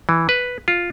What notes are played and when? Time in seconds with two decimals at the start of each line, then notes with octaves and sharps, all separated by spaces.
0.09 E3
0.29 B4
0.68 F4